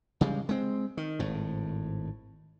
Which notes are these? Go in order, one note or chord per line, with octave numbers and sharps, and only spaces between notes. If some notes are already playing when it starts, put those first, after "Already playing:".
C#3 G3 G#3
G#3 C4
D#3
G#1 A2